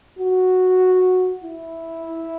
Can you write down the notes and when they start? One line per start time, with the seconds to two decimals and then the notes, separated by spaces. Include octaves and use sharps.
0.19 F#4
1.44 E4